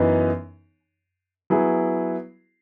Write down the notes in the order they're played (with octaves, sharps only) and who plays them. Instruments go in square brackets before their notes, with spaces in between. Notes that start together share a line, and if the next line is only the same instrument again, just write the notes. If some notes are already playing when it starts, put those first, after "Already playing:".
Already playing: [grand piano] F#2 E3 B3 D#4
F#3 B3 E4 G#4